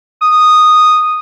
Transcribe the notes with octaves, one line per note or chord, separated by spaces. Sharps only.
D#6